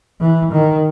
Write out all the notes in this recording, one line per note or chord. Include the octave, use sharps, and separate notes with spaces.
E3
D#3